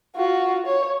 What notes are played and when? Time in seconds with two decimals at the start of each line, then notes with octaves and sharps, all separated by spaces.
0.15 F4 F#4
0.66 C#5